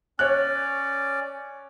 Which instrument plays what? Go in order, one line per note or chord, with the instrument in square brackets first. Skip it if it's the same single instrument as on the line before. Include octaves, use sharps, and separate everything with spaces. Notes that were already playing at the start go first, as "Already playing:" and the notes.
[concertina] C#4 D5 [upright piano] C#5 F#6